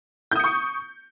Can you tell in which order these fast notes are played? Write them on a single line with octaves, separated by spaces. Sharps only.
G6 D#6 C#7 C#6